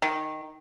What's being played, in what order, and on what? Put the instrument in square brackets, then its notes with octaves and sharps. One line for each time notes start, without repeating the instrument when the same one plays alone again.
[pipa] D#3